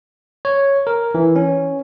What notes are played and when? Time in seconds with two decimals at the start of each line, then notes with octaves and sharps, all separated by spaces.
0.45 C#5
0.87 A#4
1.15 E3
1.36 C#4